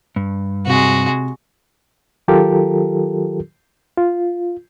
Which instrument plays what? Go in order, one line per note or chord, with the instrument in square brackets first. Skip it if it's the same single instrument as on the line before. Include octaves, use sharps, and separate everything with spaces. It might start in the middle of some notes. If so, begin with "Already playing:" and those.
[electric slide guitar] G2
[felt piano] C3 [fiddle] G#3 F#4
[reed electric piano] D#3 F#3 F4 G4 A4 A#4
F4